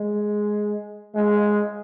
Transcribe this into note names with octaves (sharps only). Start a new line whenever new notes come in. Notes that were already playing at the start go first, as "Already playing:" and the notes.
Already playing: G#3
G#3